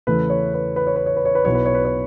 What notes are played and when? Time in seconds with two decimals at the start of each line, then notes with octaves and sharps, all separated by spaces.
0.07 E2 C#3 E3 A3 E4 B4
0.30 C#5
0.54 B4
0.76 B4
0.87 C#5
0.96 B4
1.06 C#5
1.16 B4
1.25 C#5
1.35 B4
1.45 B1 B2 B3 E4 C#5
1.55 B4
1.66 C#5
1.74 B4
1.85 C#5